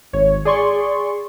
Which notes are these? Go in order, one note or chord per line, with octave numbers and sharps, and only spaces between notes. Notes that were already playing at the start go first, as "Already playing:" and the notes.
G#1 C#5
G#4 D5 C6 C#6